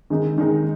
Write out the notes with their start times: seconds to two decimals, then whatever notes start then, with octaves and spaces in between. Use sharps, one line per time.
0.10 D#3 G#3 D#4
0.38 D#3 G#3 D#4